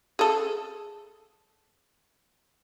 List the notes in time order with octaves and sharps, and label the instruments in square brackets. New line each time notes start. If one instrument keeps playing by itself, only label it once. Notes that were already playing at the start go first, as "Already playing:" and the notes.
[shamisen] G#4 A4